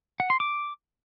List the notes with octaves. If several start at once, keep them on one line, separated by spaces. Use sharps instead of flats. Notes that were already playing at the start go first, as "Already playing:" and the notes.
F#5
C6
D6